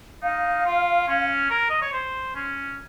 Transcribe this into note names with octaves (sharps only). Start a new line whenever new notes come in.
D#4 F5
F4
C#4
A#4
D#5
C#5
C5
C#4